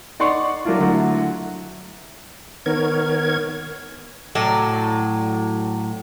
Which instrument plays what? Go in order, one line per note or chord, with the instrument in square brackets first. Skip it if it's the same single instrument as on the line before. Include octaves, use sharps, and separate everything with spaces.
[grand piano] D#4 D5 F#5 C6 C#6
F#3 A#3 D4 E4 F4
D3 F#3 A3 E4
[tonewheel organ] D#3 B3 A#4 C#5 G#6
[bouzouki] A2 F#3 D5